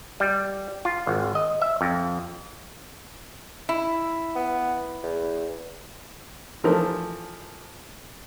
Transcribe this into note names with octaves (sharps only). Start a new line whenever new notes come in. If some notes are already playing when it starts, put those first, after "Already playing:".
G3
F4
G#1
D#5
E5
F2
E4
B3
E2
E3 F3 A3 A#4